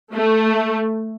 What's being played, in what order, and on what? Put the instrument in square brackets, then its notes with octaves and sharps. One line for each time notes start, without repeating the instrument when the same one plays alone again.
[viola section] A3